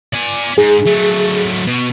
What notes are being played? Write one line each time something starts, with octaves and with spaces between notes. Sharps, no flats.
D5 G#5
G#2 G#4
F#3 A3
B2